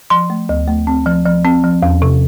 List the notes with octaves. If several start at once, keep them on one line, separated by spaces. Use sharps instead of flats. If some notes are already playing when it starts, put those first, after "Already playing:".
F3 C6
A3
D2
A3
C4
F3
F3
C4
F3
E2
C3